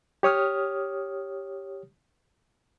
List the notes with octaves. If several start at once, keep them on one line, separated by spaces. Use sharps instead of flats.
G4 C#5 D#6 F6